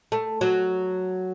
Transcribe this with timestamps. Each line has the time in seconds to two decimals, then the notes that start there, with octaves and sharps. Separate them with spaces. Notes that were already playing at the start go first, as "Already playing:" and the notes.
0.12 A3
0.41 F#3